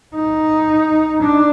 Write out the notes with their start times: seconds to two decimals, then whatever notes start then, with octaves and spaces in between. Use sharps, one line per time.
0.15 D#4
1.22 D4